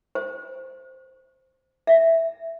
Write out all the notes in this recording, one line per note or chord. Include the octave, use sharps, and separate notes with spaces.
C5
E5